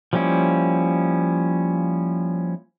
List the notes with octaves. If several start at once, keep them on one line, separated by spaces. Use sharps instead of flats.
F3 G3 A#3 C#4 E4